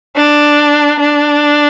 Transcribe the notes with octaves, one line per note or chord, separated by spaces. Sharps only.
D4
D4